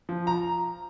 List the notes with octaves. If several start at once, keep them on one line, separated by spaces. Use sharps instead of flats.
F3
A#5